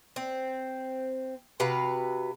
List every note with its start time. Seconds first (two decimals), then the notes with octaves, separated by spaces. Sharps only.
0.16 C4
1.60 C3 F#4 B4 F5